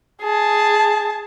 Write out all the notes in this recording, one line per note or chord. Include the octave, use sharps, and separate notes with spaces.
G#4 A5